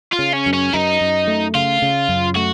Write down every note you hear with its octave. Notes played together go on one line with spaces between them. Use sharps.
F4
C#3
C#4
F#2
C#4
F#2 D#4
F#2
A3
C#3 F4
C#3
F#2
A3 F#4